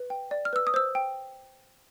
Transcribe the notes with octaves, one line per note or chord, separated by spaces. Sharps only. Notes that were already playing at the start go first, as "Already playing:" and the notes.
Already playing: B4
G5
D5
F6
B4 E6
D#6
C5 E6
G5